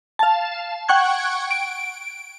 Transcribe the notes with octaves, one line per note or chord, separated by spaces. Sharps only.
F5 A5
F#5 G5 C#6 F#6 G#6
D7